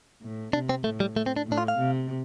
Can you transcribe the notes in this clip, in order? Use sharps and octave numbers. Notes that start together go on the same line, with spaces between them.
A2
C3 D4
C4
A2 A3
G3
A3
C4
D4
A2
D4
F4
F5
C3